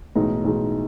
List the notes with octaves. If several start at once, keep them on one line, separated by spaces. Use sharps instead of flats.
B1 A2 E3 G#3 D#4
B1 A2 E3 G#3 D#4